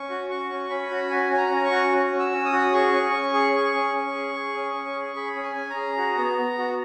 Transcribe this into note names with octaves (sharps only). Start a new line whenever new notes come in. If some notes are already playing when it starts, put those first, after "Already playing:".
Already playing: C#4 C#6
F#4
F#4 C#6
C#4
C#4 B5
F#4
F#4 G#5
C#4 G#5
A#5
C#4
C#6
F#4
F#4
C#4
E6
C#4
D#6
F#4
G#4 C#6
C#4
C#4
G#4
G#4
C#4
C#4
G#4
G#4
C#4
C#4
G#4
G#4 B5
C#4
G#5
C#4
A#5
G#4
F#4
B3
B3
F#4